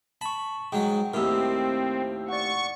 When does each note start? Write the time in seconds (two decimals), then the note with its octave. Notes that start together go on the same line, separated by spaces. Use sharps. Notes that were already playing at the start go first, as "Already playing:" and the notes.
0.21 A5 B5 C#6
0.72 G#2 F#3 G5
1.14 D#2 A2 C4 A#4 E6
2.28 D5 F#5 C#6